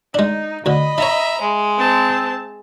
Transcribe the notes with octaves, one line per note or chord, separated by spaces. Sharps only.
G#3 D4 D#4
D2 D3 D#5 B5
D#4 C#5 E5 A#5
G#3
C4 A5